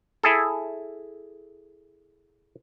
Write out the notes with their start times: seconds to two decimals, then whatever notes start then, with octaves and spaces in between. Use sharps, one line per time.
0.23 E4 G#4 A4